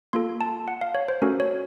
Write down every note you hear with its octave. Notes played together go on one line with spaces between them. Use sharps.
A#3 F4 A4 C6
A5
F#5
F5
C#5
C5
A3 C#4 F#4 A4 A#4
C#5